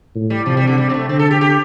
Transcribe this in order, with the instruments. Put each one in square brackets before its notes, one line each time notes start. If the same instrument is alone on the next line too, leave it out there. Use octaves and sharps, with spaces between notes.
[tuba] A2
[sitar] G3
[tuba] C3 [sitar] F3
[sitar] G3
D3
G3
C4
A3
[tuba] D3 [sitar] C4
[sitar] A4
G4
G4